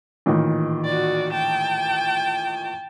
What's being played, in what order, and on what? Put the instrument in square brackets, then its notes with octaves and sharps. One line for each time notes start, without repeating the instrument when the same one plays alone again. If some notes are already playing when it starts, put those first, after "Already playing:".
[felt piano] A1 A#2 D#3
[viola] F#4 D5
G5 A5